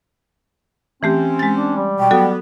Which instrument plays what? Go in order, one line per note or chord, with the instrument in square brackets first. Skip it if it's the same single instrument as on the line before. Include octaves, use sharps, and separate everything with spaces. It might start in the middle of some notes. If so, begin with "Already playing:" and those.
[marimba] E3 A3 G4 [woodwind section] C4 C#4
[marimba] G#3 A6
[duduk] D4
G3
[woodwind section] B2 [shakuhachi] G5
[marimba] F#3 F#4 A4 [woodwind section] B3